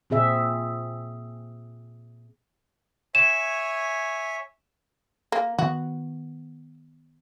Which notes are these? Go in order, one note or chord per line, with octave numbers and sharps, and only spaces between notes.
A#2 C4 G#4 E5
C#5 E5 G#5 E7
A#3
D#3 B3 F#4